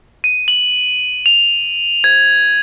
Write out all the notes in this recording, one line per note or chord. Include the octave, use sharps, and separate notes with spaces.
D#7
F#7
F7
G#6